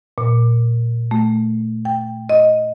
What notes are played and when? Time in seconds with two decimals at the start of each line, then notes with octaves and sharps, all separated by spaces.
0.18 A#2
1.11 A3
1.85 G5
2.29 D#5